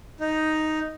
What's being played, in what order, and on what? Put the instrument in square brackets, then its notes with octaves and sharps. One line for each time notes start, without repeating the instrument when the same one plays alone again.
[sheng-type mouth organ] D#4